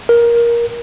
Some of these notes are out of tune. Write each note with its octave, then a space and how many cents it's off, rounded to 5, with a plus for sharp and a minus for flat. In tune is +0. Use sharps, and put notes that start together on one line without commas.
A#4 +15